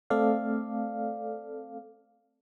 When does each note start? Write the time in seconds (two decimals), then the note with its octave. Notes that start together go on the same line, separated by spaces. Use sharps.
0.10 A3 C4 A4 D5 F5